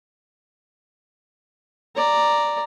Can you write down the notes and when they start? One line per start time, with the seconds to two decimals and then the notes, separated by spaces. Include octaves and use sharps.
1.96 D5 A#5